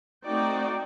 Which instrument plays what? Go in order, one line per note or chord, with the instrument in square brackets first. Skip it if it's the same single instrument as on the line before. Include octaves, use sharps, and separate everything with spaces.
[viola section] A3 C4 D#4 F#4 D5 G5